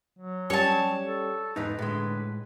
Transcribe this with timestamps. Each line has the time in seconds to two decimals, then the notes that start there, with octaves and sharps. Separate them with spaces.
0.19 F#3
0.50 G3 C#4 G4 C#5 A5
1.06 A4
1.56 E2 G#2 D#4 B4
1.79 A2 D3 G#3